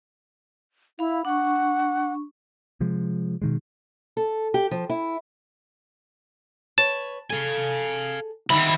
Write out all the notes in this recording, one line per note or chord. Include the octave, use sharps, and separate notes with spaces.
E4 F5 B5
D4 F#5 C#6
C3 F3 G#3
B2 D#3 G#3
A4
G4
F3
E4
B4 C#5 A5
G#4 A4 F5 G#5
D3 D#3 G3 D#4 E5 B5